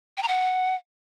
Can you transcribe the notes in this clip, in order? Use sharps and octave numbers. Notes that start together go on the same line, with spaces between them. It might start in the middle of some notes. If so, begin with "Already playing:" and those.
G5
A#5
F#5